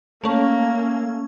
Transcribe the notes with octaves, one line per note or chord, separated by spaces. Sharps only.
A3 A#3 C#4